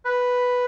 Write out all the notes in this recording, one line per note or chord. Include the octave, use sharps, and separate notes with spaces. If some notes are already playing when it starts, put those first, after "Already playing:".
B4